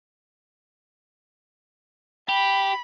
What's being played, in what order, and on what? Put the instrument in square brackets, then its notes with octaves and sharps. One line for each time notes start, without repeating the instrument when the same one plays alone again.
[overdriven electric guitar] G4 [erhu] B5